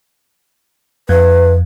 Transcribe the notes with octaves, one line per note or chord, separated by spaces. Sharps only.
F2 B4